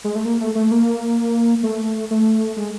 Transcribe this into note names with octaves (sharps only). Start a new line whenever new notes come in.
G#3
A3
A#3
A3
A3
A#3
A3
A3
G#3